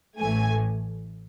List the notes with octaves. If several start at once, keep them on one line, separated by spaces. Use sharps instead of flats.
A1 A2 E3 A3 G#5